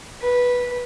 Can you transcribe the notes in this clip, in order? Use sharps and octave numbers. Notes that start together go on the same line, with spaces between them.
B4